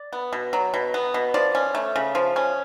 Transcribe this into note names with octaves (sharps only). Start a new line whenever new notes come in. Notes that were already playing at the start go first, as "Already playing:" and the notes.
Already playing: D5
B3
B2
F#3
B2
B3
B2
F3 D5
C#4
A3
C#3
F3
C#4